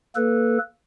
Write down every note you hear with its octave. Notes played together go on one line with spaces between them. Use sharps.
A#3 A4 B4